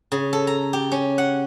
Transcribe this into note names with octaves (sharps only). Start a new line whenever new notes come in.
C#3
A4
A#5
G4
C#4
F#5